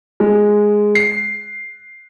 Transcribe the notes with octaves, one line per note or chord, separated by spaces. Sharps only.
G#3
C7